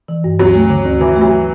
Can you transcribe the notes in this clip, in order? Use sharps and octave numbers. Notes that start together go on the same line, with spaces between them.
E3
G2
D2 F#3
A3
D3
D2
D2 E3
F#3 A3
D3